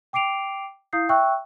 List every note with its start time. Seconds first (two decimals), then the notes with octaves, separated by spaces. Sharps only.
0.13 G5 D6 C7 D7 F7
0.93 E4 F5 D#6 G6 C7
1.09 E5 G5 C#6 E6 F#6